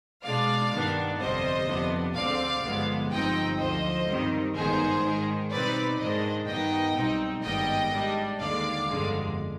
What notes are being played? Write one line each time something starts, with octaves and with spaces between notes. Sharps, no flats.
B2 G#3 D4 D5 F5
G2 D#3 B3 D4
G1 F2 C3 G3 C5 D#5
F2 C3 F3 B3 D4
D2 D3 G#3 C4 D5 F5
G1 G2 F3 G#3 B3
G1 G2 F3 C4 D#4 D#5 G5
D2 D3 F3 C5 D#5
G2 D#3 G3 C4 D#4
G#1 G2 D#3 B3 D#4 G#4 C5
G#2 D#3 G#3
B2 G3 C4 D#4 B4 D5
G#2 D#3 G#3 D4 C5 D#5
G2 D#3 B3 D#4 D#5 G5
B1 B2 G3 C4 D#4
G#1 G2 D#3 G3 B3 D#5 G5
G#2 G3 D4
D#2 D3 G#3 D5 F5
G1 F2 D3 G#3